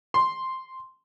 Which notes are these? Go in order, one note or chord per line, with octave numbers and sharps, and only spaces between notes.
C6